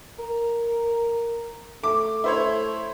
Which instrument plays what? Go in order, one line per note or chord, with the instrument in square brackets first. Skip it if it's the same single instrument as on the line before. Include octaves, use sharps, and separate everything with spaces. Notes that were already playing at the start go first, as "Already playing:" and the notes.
[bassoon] A#4
[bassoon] A3 [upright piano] D6
[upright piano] E4 C5 C#5